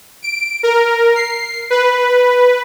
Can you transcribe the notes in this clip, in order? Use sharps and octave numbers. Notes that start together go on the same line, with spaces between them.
D7
A#4
C7
B4